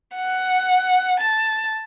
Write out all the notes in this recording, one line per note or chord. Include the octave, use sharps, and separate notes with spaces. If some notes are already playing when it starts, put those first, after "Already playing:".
F#5
A5